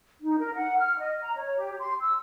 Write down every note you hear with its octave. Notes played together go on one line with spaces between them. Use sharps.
D#4
A#4
F#5
F6
D#5
A#5
C#5
G4
C6
E6